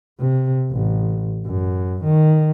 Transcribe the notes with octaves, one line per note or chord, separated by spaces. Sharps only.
C3
A1
F#2
D#3